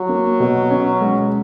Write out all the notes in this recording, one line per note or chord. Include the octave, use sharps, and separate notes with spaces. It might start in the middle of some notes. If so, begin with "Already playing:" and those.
Already playing: F#3
A#3
B2
C#4
G#3